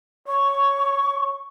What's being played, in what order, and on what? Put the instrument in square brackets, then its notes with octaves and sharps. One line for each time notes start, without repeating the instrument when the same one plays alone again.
[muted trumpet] C#5 [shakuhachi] C#6